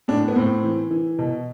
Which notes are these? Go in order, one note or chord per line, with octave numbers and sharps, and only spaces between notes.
A2 D4
B3
A2 C4
E3
E3
B2